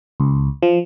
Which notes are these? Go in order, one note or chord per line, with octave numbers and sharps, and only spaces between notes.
C#2
F3